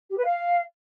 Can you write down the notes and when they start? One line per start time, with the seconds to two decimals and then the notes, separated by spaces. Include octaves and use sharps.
0.10 G4
0.17 B4
0.25 F5